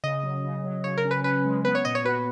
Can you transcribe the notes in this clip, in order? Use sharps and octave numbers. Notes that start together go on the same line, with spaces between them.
C#3 D#5
F#3
C#3
F#3
C#3 C#5
A#4
C#4
B4
C#4 B4
G#3
B3 B4
C#5
A#2 D#5
C#5
F#4 B4